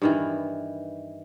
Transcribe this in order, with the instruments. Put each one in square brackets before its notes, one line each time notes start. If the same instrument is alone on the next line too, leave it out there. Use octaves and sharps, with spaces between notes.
[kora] G2 D#3 E3